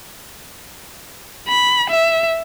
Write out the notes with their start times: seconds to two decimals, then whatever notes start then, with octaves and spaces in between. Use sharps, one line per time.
1.48 B5
1.90 E5